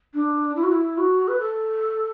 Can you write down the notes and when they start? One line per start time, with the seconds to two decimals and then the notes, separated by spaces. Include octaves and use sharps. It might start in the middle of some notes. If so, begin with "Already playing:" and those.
0.14 D4
0.56 E4
0.63 F#4
0.72 E4
0.98 F#4
1.28 B4
1.40 A4